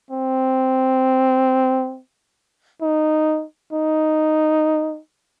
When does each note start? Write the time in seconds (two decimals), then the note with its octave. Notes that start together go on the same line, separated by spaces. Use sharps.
0.11 C4
2.82 D#4
3.73 D#4